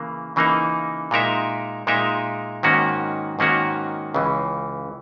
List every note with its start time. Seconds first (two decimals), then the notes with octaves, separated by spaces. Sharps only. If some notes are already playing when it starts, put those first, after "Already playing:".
Already playing: C#3 E3 A#3
0.36 C#3 E3 A#3 D#4
1.11 A#2 G#3 D#4 A#4 E5
1.87 A#2 G#3 D#4 A#4 E5
2.63 G#2 D#3 A#3 C#4 F#4
3.39 G#2 D#3 A#3 C#4 F#4
4.14 C#2 C#3 E3